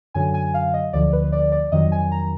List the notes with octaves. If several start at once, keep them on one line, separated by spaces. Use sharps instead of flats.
F#2 D3 F#3 G#5
G#5
F5
D#5
D2 D3 F3 D5
B4
D5
D5
F2 D#3 F#3 D#5
G#5
A#5